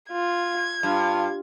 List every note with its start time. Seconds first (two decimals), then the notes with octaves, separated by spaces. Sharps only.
0.12 F4 G#6
0.83 G2 F4